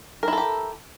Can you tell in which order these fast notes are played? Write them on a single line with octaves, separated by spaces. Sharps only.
A#4 E4 A4 G4